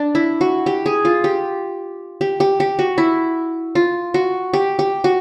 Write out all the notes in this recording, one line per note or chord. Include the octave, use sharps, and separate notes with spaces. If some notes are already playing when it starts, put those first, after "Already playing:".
Already playing: D4
E4
F#4
G4
G#4
F4
G4
G4
G4
G4
F#4
E4
F4
F#4
G4
G4
F#4